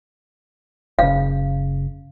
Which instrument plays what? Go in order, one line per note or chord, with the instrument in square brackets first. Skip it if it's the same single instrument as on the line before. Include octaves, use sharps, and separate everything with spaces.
[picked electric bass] F#1 C#3 [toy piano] F5